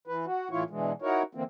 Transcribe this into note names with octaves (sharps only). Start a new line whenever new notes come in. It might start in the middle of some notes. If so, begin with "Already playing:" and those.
E3 B4
F#4
A2 E3 E4 F4 C#5
B2 D3 E3 G#3
D#4 E4 F#4 A#4 C#5
D3 E3 A#3 C4